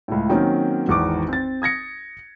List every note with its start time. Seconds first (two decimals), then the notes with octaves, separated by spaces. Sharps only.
0.08 C#2 A2
0.30 D#3 F#3 A#3 C4 C#4
0.88 G#1 E2 D#3 C#6 D6
1.29 C4 A6
1.62 D#6 G#6 A#6 C#7